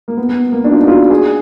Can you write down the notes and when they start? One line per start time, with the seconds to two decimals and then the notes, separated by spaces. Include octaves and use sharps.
0.08 A#3
0.17 B3
0.29 B3
0.52 A#3
0.64 D4
0.71 F4
0.76 D#4
0.82 F#4
0.88 F4
0.99 F#4
1.10 G#4